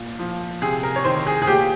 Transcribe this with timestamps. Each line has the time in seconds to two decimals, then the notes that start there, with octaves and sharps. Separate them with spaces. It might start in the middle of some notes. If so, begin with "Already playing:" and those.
Already playing: A#2
0.19 F3
0.62 C3 G#4
0.83 A#4
0.96 C#5
1.04 D#3 C5
1.27 G#4
1.42 G#4
1.47 A#2 G4